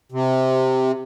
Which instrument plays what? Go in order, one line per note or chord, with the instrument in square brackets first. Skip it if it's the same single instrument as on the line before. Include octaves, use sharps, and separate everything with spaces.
[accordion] C3